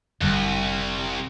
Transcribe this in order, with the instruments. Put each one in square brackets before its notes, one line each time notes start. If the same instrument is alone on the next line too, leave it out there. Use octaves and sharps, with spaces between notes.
[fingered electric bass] F1 D3 G3 [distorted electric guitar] C2